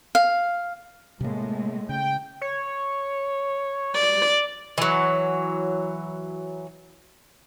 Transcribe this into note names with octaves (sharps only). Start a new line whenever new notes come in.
F5
A2 C3 G#3 A#3
C#3 G5
C#5
D5
E3 F#3